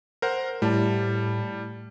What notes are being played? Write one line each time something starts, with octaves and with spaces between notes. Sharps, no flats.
A#4 C5 F#5
A2 G3 A5